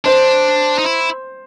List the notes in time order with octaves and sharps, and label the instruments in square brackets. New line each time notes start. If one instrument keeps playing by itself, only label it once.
[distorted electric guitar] D4 [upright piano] C5
[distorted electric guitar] D#4
E4